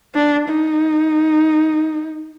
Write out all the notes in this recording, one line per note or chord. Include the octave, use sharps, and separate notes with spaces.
D4
D#4